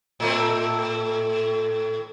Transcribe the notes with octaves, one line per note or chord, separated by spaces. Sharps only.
A2 A3 C4